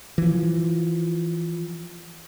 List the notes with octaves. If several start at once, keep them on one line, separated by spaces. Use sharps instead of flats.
E3 F3